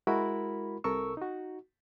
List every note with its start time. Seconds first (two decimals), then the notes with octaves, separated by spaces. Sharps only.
0.07 G#3 E4 F#4 A#4 B5
0.84 C2 C3 A4 A#4 C#6 E6
1.17 D#4 F#4